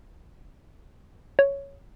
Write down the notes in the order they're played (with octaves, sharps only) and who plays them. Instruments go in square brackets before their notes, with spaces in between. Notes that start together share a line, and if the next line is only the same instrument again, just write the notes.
[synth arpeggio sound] C#5